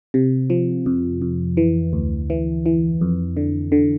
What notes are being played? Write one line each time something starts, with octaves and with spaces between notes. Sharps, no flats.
C3
F3
F2
F2
E3
D2
E3
E3
F2
D3
D3